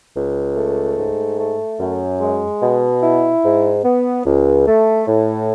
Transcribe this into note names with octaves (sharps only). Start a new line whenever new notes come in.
C#2
A3
G#2
A3
F#2
G#3
B2
E4
G#2
B3
C#2
A3
A2